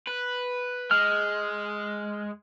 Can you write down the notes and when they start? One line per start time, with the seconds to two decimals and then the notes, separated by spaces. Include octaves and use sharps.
0.08 B4
0.91 G#3 F6